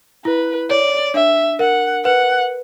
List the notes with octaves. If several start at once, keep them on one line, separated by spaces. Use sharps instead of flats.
E4 B4
C#5 D5
D4 E5
A#4 F#5
B4 F#5